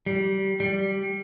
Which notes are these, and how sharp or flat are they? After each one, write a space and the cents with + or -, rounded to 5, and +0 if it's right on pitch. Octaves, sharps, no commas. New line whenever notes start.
G3 -20
G3 -5